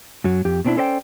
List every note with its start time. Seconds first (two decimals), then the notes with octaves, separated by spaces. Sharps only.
0.24 F#2 F#3
0.45 F2 G4
0.65 B2 C4 D4 E4
0.77 C#4 A4 C5 D5 D#5 G5